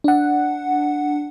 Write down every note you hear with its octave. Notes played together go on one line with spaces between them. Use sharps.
D4 F#5